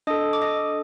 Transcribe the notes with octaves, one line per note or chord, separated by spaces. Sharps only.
D4 A4 D#5 D#6
D6
D#5 D#6